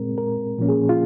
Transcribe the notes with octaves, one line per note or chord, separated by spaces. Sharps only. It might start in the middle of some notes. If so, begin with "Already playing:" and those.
Already playing: A#2 G#3 C4 A#4
A#4
A#2 F3 A#3 C#4
G#4
F4